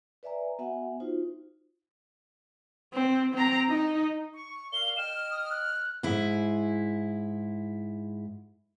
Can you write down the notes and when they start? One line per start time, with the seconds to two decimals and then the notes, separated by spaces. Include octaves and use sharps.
0.23 B4 D5 E5 G#5 A#5
0.59 B3 F#4 E5 F#5 G#5
1.00 D#4 F4 F#4 C5
2.94 C4
3.34 C4 A#5
3.69 D#4
4.35 C#6
4.73 A#4 D5 F5 G7
4.97 D#5 G5 F6 E7
5.31 D#6
5.51 F#6
6.03 G#2 E4 G#4